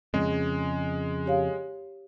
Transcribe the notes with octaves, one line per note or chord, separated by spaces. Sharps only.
F2 C#3 G#3
G4 C#5 F5